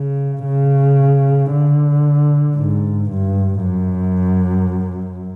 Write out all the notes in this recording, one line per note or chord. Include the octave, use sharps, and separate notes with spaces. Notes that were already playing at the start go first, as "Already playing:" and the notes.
Already playing: C#3
C#3
D3
G#2
G2
F#2